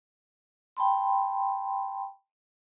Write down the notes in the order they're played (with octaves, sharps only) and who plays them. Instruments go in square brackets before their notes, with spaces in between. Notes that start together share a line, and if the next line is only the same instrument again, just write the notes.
[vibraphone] G5 A5 B5 C6